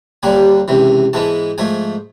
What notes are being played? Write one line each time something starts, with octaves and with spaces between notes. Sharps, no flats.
D#2 D3 G3 A#3 D4 G#5
C#2 C3 E3
G#2 E3 G#3 B3 A5
G#2 F3 A3 G#5